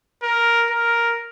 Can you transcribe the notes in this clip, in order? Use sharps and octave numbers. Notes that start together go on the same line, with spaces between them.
A#4
A#4